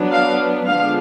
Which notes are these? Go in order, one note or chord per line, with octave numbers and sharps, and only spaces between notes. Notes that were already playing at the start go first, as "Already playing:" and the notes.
Already playing: F#3 B3 D4
F5
D3 F3 G#3 B3 D4 F5